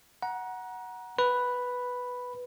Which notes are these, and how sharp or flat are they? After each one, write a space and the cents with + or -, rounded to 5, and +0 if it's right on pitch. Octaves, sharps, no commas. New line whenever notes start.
F#5 +0 A#5 +30
B4 +0 B5 +0